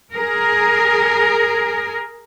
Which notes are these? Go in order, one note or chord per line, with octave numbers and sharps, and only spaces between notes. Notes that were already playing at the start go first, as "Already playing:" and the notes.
G#4 A#4